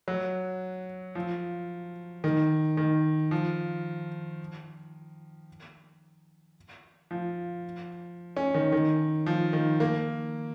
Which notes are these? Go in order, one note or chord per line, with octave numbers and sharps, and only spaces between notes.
F#3
F3
D#3
D#3
F3
F3
C#4
D#3
D#3
F3
D#3
A#3